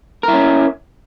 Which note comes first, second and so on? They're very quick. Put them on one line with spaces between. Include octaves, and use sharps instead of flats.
A#4 E4 C#4